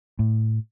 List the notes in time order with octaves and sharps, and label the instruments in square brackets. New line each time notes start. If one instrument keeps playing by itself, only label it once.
[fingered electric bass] A2